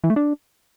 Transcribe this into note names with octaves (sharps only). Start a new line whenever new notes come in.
E3
A3
D4